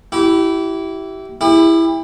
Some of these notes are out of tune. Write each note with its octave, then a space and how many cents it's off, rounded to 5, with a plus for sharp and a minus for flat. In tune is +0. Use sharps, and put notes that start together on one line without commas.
E4 +0 G4 -30
E4 +0 G4 +40